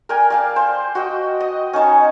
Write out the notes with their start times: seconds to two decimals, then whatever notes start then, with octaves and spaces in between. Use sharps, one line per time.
0.09 A#4 D5 G5 G#5
0.30 D5 F5 A5
0.56 C5
0.95 F#4 D#5 G5
1.41 D#5
1.73 C#4 D#4 C#5 A5